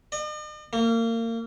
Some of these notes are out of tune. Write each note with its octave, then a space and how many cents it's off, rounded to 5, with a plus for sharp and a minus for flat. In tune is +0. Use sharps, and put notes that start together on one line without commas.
D#5 -45
A#3 -30